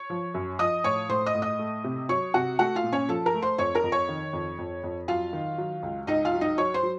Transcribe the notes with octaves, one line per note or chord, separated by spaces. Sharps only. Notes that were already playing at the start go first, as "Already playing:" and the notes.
Already playing: C#5 C#6
F3
F#2
F3 D#5 D#6
A2 C#5 C#6
A2 C5 C6
D#5 D#6
A2
D#5 D#6
A3
C3
F#3 C#5 C#6
C3 F#4 F#5
A3 F#4 F#5
F4 F5
A#2
C#4 C#5
F3 A4 A5
A#4 A#5
A3
C5 C6
F2 C#5 C#6
A#4 A#5
F2
C#5 C#6
D#3
F2
F2
F2
F#3 F4 F5
D#3
F#3
C#2
C#2 D#4 D#5
F4 F5
F#3
D#4 D#5
F#3 C#5 C#6
C5 C6
F#3